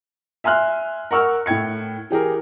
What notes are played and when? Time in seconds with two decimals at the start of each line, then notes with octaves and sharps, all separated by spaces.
0.44 E5 G#5 C6 F6 F#6
1.11 A#4 F#5 C#6 E6 F6
1.46 A2 E4 G5 G#6 C#7
2.11 E3 G4 G#4 A#4